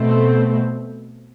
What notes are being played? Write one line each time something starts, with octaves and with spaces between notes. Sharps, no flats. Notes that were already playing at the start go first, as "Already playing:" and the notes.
Already playing: B2 A3 C4